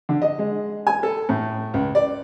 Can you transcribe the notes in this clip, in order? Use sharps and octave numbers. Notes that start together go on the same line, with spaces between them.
D3
D#5
G#3
G#5
A4
A2
C#2
D5